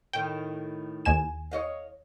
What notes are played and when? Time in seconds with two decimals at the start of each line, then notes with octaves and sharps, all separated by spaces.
0.13 A2 D#3 G5
1.05 D#2 G#5 E7
1.51 C#5 D#5 F5